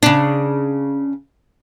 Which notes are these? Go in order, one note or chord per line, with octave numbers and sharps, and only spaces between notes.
C#3 D4